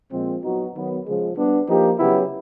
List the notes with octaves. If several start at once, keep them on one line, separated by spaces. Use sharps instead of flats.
A#2 F3 G#3 C4
F#3 B3 D#4 F#4
D#3 F#3 B3
C#3 F3 G#3
G3 B3 D4
F3 A#3 D#4 G4
C#3 F#3 B3 E4 G4